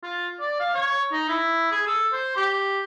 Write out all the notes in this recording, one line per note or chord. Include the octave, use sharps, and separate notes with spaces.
F4
D5
F5
C#5
D#4
E4
G#4
A4
C5
G4